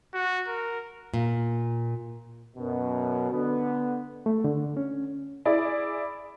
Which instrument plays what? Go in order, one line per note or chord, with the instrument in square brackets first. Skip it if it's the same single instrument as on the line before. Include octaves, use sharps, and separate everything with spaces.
[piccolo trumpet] F#4
A#4
[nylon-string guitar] A#2
[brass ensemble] F#2 B2
D3 B3
[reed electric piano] A3
D3
C#4
[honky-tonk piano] E4 G#4 D5